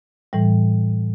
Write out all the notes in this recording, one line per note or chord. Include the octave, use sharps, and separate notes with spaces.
A2 E3 G3